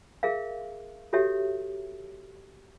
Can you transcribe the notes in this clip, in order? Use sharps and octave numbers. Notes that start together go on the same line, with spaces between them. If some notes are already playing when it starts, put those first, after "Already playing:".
G#4 A#4 E5 F5
F#4 G4 A4 C#5 E5